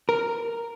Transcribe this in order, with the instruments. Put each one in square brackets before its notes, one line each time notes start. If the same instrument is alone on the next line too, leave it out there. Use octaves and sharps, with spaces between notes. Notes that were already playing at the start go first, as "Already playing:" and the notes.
[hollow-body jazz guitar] A#4